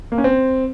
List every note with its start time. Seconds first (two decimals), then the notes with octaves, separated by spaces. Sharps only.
0.12 A#3
0.18 C#4
0.24 C4